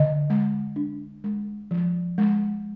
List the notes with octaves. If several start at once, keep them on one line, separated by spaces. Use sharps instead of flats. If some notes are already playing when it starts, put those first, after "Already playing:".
Already playing: D3 D#5
G#3
D4
G#3
F3
G#3